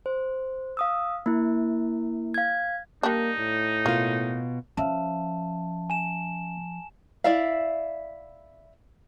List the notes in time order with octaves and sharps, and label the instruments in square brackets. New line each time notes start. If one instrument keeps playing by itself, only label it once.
[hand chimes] C5
F5 D#6 E6
A#3 E4
F5 G#6
[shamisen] G3 D4 [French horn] A#3 [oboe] D#4
[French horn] A2
[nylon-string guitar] B2 F4 [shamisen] A#3
[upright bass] F3 [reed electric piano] C#4 E5 F5 [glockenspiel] A5
[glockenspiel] G#5 E7
[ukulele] E4 D5 E5 F5